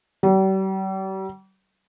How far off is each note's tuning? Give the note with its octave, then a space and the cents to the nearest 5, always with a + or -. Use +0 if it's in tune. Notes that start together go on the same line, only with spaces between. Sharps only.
G3 -40